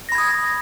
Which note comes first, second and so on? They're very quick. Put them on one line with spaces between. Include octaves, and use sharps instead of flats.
A#6 B5 G#6 D#6